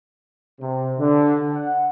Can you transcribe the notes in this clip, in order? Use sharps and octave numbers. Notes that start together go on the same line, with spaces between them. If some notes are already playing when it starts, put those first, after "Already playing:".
C3
D3
F#5